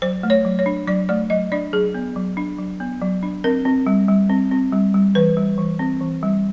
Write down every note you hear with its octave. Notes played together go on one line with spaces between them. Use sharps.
F#3 C5
A3
C#5
F#3
C#5
D4
F#3 D5
A3 D5
F#3 D#5
D4 D5
F#3 G#4
B3
F#3
D4
F#3
B3
F#3
D4
C4 A#4
C4
G3
G3
C4
C4
G3
G3
E3 B4
G3
E3
C4
E3
G3